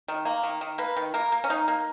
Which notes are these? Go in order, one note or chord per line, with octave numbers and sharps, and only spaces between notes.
D#3
A#3
D#3
D#3
A#3 B4
D#3
A#3 A#4
A#3
C#4
A#3 D#4
A#3